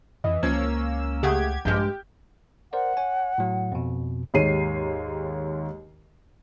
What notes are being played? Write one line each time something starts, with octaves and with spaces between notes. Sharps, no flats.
F2 E3 D#5
C#2 F3 A#3 C#4 E6 G#6
C#3 A3 G4 G#4 F#5 G#6
A#1 G2 G#3 G4 F6 G6
A#4 C5 D5 F#5
C#5 G#5
A2 F#3
F2 B2
D#2 G#2 G4 C#5 C7 D#7